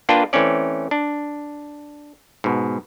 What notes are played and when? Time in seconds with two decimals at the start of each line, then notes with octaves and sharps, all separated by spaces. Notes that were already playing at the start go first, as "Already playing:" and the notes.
0.09 A#3 D4 F4 B4 G5 A5
0.33 E3 A3 C4 C#4 D5
0.91 D4
2.44 G#2 B2